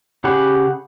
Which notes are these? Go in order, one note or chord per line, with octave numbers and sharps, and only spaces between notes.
C#3 G4 G#4 F#5 B5